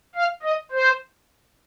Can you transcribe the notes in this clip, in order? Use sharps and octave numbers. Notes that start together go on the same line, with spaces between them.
F5
D#5
C5